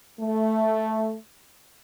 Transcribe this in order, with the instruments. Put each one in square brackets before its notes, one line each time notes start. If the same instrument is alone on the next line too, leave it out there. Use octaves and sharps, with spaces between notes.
[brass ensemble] A3